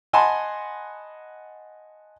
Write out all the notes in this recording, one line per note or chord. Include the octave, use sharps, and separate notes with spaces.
D#5 F#5 G#5 A5 B5 C6